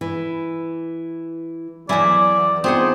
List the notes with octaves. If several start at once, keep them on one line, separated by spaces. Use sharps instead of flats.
E3
E2 F#3 E4 D5 E5 G#5
A3 B3 C4 D#4 F4 G#4 F#5